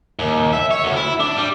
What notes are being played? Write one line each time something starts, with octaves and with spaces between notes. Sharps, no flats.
D#2
E5
C#5
D2
E4
D4
G3